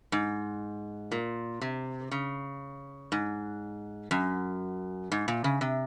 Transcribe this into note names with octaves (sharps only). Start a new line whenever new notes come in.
G#2
A#2
C3
C#3
G#2
F#2
G#2
A#2
C#3
C3